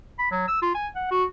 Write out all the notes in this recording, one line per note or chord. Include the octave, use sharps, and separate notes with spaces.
B5
F#3
E6
F4
G#5
F#5
F#4